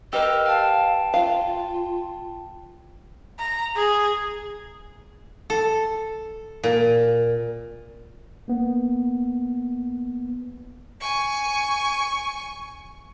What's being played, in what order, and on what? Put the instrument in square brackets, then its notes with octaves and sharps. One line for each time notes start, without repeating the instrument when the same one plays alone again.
[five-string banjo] G4 [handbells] A#4 B4 E6 [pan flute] D#5
[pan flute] F5 [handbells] G5 A5
[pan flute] F4 [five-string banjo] F5
[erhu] A#5
G#4
[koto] A4
A#2
[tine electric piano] A#3 B3
[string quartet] G#5 C#6